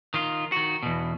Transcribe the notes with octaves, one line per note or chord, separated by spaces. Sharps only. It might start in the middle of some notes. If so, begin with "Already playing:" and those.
D#3 F4
D#3 F#4
E2 B2